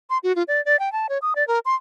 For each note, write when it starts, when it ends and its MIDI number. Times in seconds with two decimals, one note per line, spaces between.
0.10 0.18 84
0.23 0.35 66
0.36 0.43 65
0.48 0.64 74
0.65 0.79 74
0.80 0.92 79
0.92 1.07 81
1.09 1.18 73
1.22 1.34 87
1.36 1.46 74
1.48 1.59 70
1.65 1.75 84